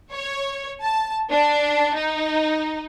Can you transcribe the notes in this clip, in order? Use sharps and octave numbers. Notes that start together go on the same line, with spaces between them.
C#5
A5
D4
D#4